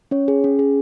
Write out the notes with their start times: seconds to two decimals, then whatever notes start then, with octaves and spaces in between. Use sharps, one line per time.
0.11 C#4 C#5
0.28 G#4
0.44 C#4
0.59 G#4